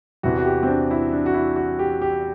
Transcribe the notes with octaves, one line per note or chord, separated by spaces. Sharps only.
E2 C3 E3 F#4
F#4
G4
C4
D4
E4
D4
F#4
E4
F#4
G4
G4